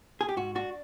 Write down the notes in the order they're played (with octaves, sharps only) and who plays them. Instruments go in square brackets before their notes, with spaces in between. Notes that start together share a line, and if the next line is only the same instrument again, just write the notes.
[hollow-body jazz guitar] G#4
G4
G#2 F#4
D4 F#4